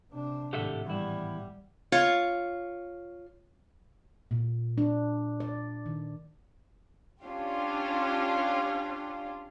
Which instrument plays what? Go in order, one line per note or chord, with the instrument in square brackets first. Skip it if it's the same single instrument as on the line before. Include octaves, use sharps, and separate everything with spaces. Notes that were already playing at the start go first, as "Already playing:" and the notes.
[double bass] C3 D4
[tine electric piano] G#1 A2 F#5 [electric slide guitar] G4 A4 E5
[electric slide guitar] E2 E4 [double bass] G3
[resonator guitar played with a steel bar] F4 C#5
[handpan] A#2
D4
D5
D#3
[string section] C#4 D4 F4 G4